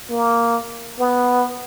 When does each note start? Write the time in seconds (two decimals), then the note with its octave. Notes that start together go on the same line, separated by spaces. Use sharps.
0.10 A#3
0.99 B3